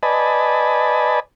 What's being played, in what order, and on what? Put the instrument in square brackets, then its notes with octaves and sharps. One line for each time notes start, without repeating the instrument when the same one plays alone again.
[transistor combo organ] B4 D5 D#5 G#5 A5 B5